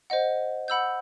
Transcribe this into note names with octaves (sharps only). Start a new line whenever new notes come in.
C5 D#5 F#5
F#5 B5 E6 G6